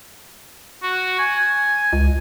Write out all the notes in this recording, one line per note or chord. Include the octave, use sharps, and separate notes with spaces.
F#4
G#5
C#2